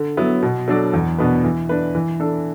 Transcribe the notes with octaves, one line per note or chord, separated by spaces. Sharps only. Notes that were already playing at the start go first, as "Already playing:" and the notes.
Already playing: D3
F#3 B3 E4
B2
F#3 D4 A4 D5
E2
B2 B3 D4 B4
E3
D4 B4
E3
D4 A4